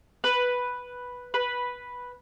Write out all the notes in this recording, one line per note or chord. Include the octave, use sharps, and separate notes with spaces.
B4
B4